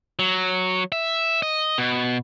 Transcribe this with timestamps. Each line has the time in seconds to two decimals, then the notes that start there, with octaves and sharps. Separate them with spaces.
0.19 F#3
0.92 E5
1.42 D#5
1.78 B2